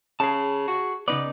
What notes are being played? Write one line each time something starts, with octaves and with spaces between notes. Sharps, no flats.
C#3 G#4 A5
F#4
C#3 B3 D#4 D5